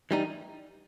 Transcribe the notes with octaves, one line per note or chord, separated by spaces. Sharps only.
E3 G3 D#4